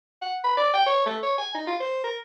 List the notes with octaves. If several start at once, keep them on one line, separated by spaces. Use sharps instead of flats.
F#5
B5
D5
G5
C#5
A3
C#5
G#5
D#4
F4
C5
A#4